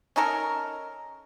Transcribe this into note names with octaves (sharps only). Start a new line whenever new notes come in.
C#4 D#4 A4 A#4